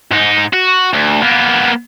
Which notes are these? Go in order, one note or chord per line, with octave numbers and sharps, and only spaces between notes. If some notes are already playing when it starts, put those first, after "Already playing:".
G#2 D#4
F#4
D2
A#3 B3